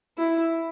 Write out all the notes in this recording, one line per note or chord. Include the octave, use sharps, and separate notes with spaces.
E4